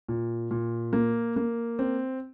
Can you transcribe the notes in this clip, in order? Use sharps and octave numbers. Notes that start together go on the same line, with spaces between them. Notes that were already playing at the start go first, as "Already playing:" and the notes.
A#2
A#2
A#3
A#3
C4